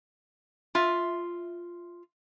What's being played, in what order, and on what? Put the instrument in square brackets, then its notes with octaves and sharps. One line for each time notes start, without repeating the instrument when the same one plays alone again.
[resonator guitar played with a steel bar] F4 E5